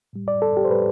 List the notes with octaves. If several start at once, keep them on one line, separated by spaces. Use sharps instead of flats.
A2 G3
D5
A4
G4
C5
A2 G3 B4